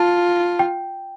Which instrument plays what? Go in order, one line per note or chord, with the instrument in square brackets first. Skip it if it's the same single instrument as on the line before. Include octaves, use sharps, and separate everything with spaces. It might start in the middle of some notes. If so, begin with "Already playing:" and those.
Already playing: [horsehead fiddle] F4 [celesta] A5
[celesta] G5